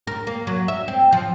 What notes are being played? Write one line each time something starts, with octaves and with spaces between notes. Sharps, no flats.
A#4
A#3
F#3
E5
C4
F3